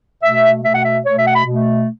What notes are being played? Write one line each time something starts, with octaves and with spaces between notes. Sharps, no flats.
B2 A3 E5
B2 A3 E5
F#5
E5
B2 A3 C#5
E5
F#5
B5
B2 A3